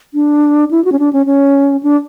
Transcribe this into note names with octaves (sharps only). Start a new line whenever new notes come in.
D4
E4
F#4
C#4
D4
C#4
C#4
D4